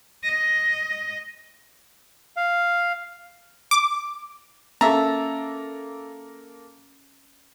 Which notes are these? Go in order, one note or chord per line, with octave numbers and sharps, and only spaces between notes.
D#5
F5
D6
A#3 C#4 A4 E5 A5 A#5